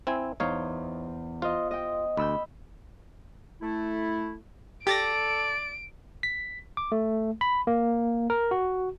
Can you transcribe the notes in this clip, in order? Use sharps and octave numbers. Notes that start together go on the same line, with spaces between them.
C4 E4 G#5
E2 D#4 C5 C#5 F5
F4 C5 D#5
D#5 G5
D2 B5 E6 G6
A3 E4
G4 A4 D5 A6 A#6 D7
B6
D6
A3
B5
A#3
A#4
F#4